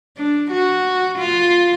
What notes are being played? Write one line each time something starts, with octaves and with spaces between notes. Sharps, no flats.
D4
F#4
F4